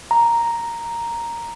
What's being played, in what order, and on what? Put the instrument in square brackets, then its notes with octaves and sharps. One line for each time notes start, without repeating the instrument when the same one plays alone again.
[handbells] A#5